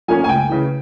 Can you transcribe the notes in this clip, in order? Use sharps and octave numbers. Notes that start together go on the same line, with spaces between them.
F3 A#3 C#4 G#5
G#5
C#2 G5
C#3 E3